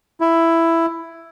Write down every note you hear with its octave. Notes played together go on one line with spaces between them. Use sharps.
E4